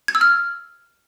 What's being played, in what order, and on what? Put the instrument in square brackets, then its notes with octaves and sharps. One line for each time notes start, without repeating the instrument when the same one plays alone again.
[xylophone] G#6
E6
F6